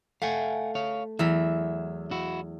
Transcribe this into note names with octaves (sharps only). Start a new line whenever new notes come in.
A3 F5 F#5 G#5
C#5 F5
E2 F#3 E5 B5
E4 F#4